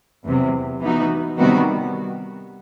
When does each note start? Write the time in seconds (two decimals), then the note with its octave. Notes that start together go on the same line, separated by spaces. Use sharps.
0.25 E2 C3 F#3
0.81 E3 B3 D#4 F#4
1.37 C3 D#3 G3 B3 F#4